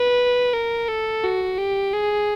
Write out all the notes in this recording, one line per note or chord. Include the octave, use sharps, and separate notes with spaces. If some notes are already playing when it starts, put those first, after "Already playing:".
Already playing: B4
A#4
A4
F#4
G4
G#4